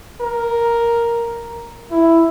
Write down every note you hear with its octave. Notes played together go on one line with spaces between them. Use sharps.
A#4
E4